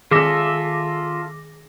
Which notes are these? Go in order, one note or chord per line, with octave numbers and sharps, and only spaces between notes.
D#3 F4 G#4 A4 E5 D6 A#6